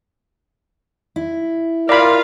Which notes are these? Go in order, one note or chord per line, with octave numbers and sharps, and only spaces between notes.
E4
F4 A#4 D5 F5 B5